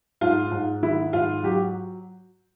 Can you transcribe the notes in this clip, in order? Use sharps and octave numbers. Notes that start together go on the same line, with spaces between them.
G#2 F4
G#2
D#3 E4
G#2 F4
F#3 G4